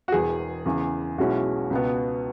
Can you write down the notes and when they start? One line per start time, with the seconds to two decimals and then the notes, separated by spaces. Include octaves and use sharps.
0.08 F#4
0.12 E1 E2 E3 G#4
0.66 E2 C#3 E3
1.18 B1 B2 G#3 C#4 E4 F#4
1.70 C#2 B2 B3